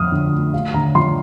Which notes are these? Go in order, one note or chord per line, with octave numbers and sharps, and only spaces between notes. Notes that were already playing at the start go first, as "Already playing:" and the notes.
Already playing: F2 F3 D#6 F6
D3
A3
A3 F5
D3 A#5
F3 C6